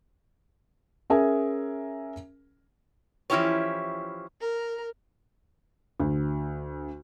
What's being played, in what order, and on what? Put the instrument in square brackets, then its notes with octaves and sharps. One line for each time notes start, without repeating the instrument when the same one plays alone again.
[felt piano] C#4 G#4 A#4 E5 G#5
[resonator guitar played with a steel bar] E3 F3 C#4 E4 G4 C#5
[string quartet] A#4
[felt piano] D2